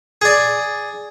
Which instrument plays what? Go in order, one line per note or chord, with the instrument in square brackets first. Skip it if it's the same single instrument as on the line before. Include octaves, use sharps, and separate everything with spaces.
[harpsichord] G#4 D5